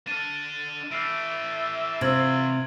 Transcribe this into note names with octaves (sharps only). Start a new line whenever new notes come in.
D4 A4 F6 D#7
E3 A3 E5 F6 C7 D7
C3 F4 E6 G#6 F#7